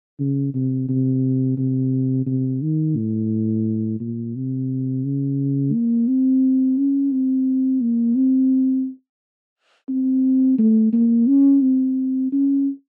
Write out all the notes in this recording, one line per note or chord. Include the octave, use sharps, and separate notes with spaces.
C#3
C3
C3
C3
C3
D#3
A2
A#2
C3
C#3
A#3
C4
C#4
C4
A#3
C4
C4
A3
A#3
C#4
C4
C#4